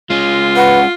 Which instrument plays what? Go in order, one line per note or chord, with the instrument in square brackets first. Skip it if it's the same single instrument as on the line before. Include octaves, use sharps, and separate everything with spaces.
[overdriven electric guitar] G#3 C#4 [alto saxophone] F4
[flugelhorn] B4 [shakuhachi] F#5